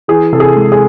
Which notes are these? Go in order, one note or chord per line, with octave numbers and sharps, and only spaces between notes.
E3 G#4
C3 A4
G#4
G#3
G#4